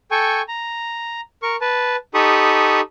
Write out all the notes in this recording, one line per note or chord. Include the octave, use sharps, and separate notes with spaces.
A4 G5 G#5 C#6
A#5
A#4 C#6
B4 A5
D#4 G4 A4 B5 C#6 D#6